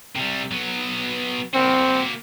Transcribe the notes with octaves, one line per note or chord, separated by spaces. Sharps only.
C3 G3
F#3 B3
A#3 C4 F#4